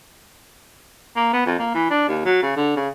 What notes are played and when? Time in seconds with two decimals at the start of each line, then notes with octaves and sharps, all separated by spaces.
1.16 A#3
1.33 B3
1.46 F2
1.59 A#3
1.74 E3
1.91 D4
2.08 D#2
2.25 F#3
2.43 C#3
2.57 D3
2.76 C#3